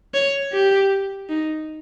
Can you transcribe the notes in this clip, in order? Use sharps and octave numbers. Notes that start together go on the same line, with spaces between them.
C#5
G4
D#4